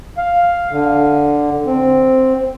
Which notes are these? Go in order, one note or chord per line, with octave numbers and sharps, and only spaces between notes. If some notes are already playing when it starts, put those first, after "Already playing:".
F5
D3
C4